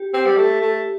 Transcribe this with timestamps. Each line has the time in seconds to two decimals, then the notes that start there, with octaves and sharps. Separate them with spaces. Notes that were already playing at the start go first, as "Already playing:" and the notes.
Already playing: G4
0.14 C4
0.26 G3
0.37 A3
0.61 A3